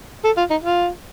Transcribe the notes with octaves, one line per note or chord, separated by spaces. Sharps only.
A4
F4
D#4
F4